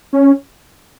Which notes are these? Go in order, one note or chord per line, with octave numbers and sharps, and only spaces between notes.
C#4